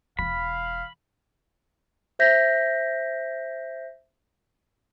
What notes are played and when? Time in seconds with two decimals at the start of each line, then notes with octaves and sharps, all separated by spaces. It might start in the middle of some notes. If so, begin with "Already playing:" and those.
0.19 E1 E3 F5 B5
2.19 C5 E5 G6 A#6 B6